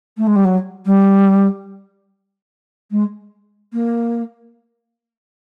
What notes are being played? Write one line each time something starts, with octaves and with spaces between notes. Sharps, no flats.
A3
G#3
G3
F#3
G3
G#3
A#3